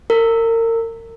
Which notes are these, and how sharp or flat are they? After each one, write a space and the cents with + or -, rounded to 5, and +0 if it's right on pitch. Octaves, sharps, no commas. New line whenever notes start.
A#4 -35